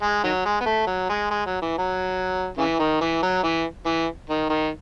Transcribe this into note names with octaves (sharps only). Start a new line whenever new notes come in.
G#3
D#3 F#3
G#3
B3
A3
F#3
G#3
G#3
F#3
E3
F#3
C#3 E3
D#3
E3
F#3
E3
E3
D#3
D#3